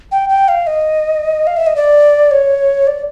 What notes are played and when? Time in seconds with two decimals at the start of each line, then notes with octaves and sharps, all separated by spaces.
0.12 G5
0.29 G5
0.48 F5
0.67 D#5
1.47 F5
1.57 E5
1.67 D#5
1.76 D5
2.31 C#5
2.87 D5